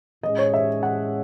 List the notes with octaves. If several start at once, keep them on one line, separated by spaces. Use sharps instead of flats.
A2 G#3 C#4 G#4 D#5
C#5
E5
F#5